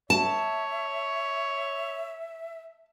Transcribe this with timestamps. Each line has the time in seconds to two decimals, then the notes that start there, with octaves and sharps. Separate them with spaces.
0.10 C#5 E5 A5